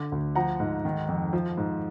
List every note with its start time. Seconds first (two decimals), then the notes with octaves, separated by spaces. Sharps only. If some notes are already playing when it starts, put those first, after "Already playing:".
Already playing: D3 D6
0.12 D2
0.35 F3 F#5 A#5
0.60 G#2
0.85 D#3
1.09 F2
1.33 F3
1.57 G#2